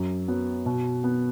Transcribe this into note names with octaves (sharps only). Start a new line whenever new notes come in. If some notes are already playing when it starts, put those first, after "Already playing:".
Already playing: F#2
F#3 B3
B2
B3